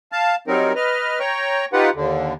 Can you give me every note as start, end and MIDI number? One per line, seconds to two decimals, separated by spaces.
0.12 0.35 77
0.12 0.35 81
0.48 0.73 54
0.48 0.73 55
0.48 0.73 60
0.48 0.73 63
0.48 0.73 70
0.76 1.19 71
0.76 1.19 75
0.76 1.19 89
1.20 1.65 73
1.20 1.65 79
1.20 1.65 82
1.20 1.65 85
1.73 1.90 63
1.73 1.90 65
1.73 1.90 67
1.73 1.90 71
1.73 1.90 78
1.95 2.33 39
1.95 2.33 50